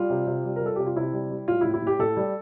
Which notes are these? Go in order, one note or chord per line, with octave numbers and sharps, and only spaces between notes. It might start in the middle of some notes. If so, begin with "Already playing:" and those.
Already playing: G3 F4
C3
C3
G3
A#4
G3 A4
C3 G4
F4
C3 E4
G3
G3
A2 F4
E4
A2
E4
A2 G4
A2 A4
G3